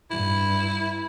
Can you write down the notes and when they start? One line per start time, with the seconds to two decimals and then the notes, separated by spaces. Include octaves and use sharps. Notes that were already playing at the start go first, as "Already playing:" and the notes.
0.11 G2 E4